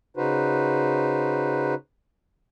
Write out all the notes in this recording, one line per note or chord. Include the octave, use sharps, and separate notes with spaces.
C#3 D#4 F#4 B4 C5